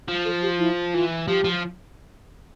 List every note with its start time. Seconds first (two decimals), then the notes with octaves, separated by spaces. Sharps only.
0.08 F3
0.25 A4
0.42 G4
0.59 E4
0.93 E3 F4
1.27 F3 G4
1.44 F3